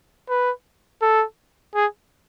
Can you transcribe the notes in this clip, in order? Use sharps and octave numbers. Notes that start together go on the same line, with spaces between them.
B4
A4
G#4